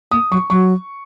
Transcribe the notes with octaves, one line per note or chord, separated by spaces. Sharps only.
A#3 D#6
F#3 C#6
F#3 C#6